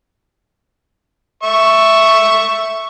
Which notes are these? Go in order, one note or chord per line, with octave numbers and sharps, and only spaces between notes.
E5 C#6